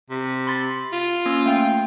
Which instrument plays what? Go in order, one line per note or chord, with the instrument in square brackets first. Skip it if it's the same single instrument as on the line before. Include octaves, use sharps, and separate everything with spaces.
[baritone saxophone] C3
[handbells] B5 C6 A6
[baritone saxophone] F4
[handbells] A#3 C#4 E6
A3 F5 G5